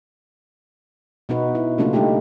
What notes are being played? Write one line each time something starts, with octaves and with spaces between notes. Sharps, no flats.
B2 B3 D#4 F#4 B4
E4
C#3 F#3 A3 A#3 D4 F4
G3 A3 D#4 F4 G4